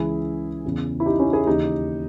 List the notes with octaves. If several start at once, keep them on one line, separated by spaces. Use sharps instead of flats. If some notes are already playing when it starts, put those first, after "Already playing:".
Already playing: C#2 C#3 E3 E4 G#4
E2 C#3 E3
E4
D#4 G4
C#4 E4
E4 G#4
D#2 C#3 E3 D#4 G4